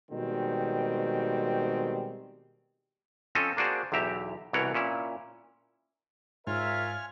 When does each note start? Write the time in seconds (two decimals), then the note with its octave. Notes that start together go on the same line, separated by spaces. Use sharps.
0.11 B2 D#3 G3 G#3 C4
3.35 F3 C4 C#4 A4 D#5
3.57 A#3 D4 F#4 G#4 C5
3.92 B1 E2 G4 E5 A#5
4.53 C2 B2 E3 A#4 C#5 F#5
4.74 A#2 C#4 E4
6.47 G#2 F4 A#4 C#5 E5 G#5 F6